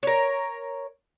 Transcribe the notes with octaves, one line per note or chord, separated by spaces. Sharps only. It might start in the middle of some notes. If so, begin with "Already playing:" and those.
A#4 C#5